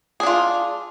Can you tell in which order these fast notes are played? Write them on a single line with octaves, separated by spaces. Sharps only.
G#4 D4 F4